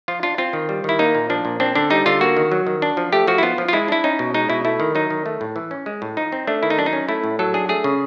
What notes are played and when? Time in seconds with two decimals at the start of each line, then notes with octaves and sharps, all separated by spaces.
0.08 F3 F4
0.23 D4 F4
0.38 C4 F4
0.53 D#3
0.69 G3
0.84 D#3 E4
0.99 A#3 D#4
1.15 A#2
1.30 F3 D4
1.45 A#2
1.60 C4 D4
1.75 D3 D4
1.90 G3 D#4
2.06 D3 F4
2.21 A#3 F#4
2.37 D#3
2.52 F#3
2.67 D#3
2.82 D4
2.97 F3
3.13 A3 G4
3.28 F3 F#4
3.38 E4
3.43 B3 F4
3.58 F3
3.69 F4
3.73 G#3 E4
3.88 D4 E4
4.04 C#4 D#4
4.19 B2
4.34 G#3 D#4
4.50 B2 E4
4.65 A3 E4
4.80 D#3
4.95 F#3 D#4
5.11 D#3
5.26 A3
5.41 A2
5.56 E3
5.71 C#4
5.86 G#3
6.02 A2
6.17 F3 D#4
6.32 C4
6.47 A3 D4
6.63 D#3 E4
6.70 D#4
6.78 F#3 D4
6.86 D#4
6.93 C#4
7.08 A3 E4
7.24 A2
7.39 F#3 A4
7.54 D4 G#4
7.69 A3 G#4
7.84 C#3